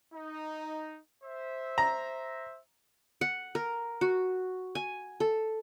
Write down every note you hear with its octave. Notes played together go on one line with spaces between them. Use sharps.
D#4
C5 E5
A#5
F#5
A#4
F#4
G#5
A4